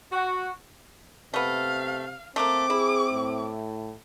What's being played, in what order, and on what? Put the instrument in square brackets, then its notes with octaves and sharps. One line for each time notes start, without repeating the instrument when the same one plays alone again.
[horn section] F#4
[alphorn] C3 [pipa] A3 B3 [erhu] F5
[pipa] A3 A#3 [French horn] C4 [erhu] D6
[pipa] E4 [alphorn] G#4
[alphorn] A2